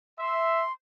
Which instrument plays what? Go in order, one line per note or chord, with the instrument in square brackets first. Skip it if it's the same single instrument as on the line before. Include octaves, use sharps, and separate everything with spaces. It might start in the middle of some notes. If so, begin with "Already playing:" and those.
[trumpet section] E5 [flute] C6